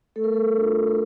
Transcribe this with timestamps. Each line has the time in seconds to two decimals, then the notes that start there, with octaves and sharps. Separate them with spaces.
0.16 A3 A4
0.24 A#4
0.33 A4
0.56 D4 F4
0.88 A#4